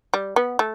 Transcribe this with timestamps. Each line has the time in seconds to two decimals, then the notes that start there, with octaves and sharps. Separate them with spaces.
0.14 G3
0.36 B3
0.59 A3